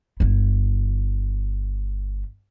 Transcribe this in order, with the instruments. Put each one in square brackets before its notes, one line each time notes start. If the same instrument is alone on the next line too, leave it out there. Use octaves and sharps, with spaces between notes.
[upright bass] G1 E4